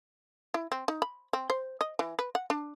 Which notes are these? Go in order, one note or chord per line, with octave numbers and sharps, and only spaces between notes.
E4
C4
D#4
B5
C4
C5
D#5
E3
B4
F#5
D4